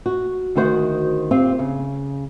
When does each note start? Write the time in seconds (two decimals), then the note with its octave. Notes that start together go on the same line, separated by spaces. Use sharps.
0.06 F#4
0.55 D2 D#3 F#4 C5 F#5
1.31 C4 F4 G4
1.59 C#3